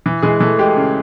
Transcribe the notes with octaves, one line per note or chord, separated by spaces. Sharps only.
E3
E3 G#3 G#4
E3 A3 A4
G#3 G4
C#3